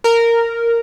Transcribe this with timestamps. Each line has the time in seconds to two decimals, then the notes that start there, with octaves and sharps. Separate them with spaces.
0.04 A#4